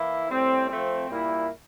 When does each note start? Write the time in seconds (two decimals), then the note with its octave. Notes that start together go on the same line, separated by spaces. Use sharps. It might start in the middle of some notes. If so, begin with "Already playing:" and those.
Already playing: E3 A#3 E4
0.30 A2 G3 C4
0.69 F3 A3 C4
1.09 A#2 G3 A#3 E4